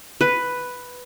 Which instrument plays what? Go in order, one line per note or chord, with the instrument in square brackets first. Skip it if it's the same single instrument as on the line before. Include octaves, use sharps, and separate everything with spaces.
[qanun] B4